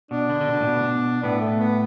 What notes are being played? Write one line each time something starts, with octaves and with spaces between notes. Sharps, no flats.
B2 D4
D3
D3
B2
A2
B2
A2 B3
A3
B3